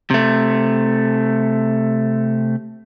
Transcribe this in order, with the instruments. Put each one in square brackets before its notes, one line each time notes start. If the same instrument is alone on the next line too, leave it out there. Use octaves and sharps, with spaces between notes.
[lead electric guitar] C3 A3